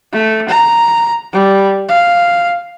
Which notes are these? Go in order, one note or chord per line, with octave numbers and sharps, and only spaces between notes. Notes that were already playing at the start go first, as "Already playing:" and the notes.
A3
A#5
G3
F5